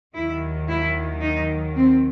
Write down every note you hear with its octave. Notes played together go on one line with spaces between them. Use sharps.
D#2 D#3 F#3 E4
E4
D#4
C4